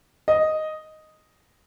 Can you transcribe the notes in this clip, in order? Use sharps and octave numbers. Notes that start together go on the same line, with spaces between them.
D#5